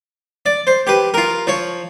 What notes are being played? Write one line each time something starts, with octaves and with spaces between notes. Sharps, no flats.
D5
C5
G4 B4
F4 A#4
F3 C#5